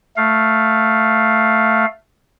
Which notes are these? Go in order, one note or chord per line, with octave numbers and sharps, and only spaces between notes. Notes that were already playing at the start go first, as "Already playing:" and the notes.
A3 F5